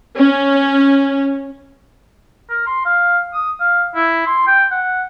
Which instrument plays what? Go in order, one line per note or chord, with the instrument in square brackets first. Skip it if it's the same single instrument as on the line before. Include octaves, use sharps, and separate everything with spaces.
[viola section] C#4
[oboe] A#4
C6
F5
D#6
F5
E4
C6
G5
F#5